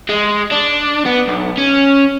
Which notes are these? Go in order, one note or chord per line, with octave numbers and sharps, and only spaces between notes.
G#3
D4
B3
B1
C#4